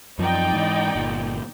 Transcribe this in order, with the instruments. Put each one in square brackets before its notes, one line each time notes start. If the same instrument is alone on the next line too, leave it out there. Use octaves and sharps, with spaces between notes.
[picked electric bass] F#2 F3 [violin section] D#4 D5 G5
[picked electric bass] G#2 E3
G1 A#2